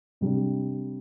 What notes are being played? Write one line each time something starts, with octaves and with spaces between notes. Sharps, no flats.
C3 G3 D4